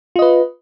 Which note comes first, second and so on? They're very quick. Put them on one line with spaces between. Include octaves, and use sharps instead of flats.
F4 D#5 B4